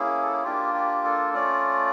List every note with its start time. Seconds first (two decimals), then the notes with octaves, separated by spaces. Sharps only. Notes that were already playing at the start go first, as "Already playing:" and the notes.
Already playing: A#3 C#4 E4 G#4
0.22 A4
0.33 G#4
0.44 A#3 D4 F4 G4
0.74 G4
1.04 A4
1.34 A3 C#4 F4 D5